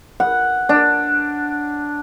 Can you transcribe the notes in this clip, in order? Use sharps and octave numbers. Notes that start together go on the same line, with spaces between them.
F#5
D4